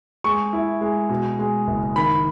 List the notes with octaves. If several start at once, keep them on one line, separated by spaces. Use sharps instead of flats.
G#3 C#6
E4
G#3
B2
G#3
F#1
D#3 B5